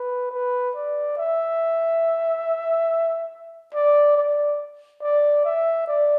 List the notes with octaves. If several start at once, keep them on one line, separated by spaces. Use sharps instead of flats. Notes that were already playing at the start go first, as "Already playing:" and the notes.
Already playing: B4
B4
D5
E5
D5
D5
D5
E5
D5